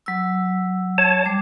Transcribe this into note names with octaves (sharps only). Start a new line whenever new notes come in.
F#3 E6
C#5 A5
G3 D6